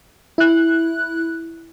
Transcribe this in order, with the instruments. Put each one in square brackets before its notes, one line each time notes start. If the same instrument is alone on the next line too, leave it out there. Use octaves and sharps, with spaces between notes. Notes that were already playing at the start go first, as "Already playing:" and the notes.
[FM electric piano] E4 F#6